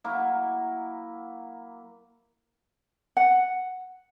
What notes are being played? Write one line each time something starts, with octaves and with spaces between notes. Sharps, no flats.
F#3 A#3 E4
F#5